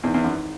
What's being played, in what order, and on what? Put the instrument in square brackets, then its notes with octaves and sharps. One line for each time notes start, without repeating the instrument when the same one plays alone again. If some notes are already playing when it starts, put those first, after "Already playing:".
[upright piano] G#1 G#2 E3 [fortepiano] E2
[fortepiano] E2
F#2